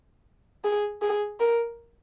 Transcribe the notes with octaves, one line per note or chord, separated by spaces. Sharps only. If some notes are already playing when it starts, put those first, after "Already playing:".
G#4
G#4
A#4